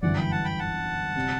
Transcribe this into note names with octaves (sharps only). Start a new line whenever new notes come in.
G1 F#2 E3 D5 F#5
G5 B5
F#5 A5
G5 B5
F#5 A5
C3 G3 C4